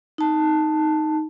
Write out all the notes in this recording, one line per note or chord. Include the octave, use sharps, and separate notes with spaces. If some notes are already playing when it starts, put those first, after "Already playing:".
D#4 A5